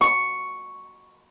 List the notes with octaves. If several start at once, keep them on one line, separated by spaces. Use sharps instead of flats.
C#6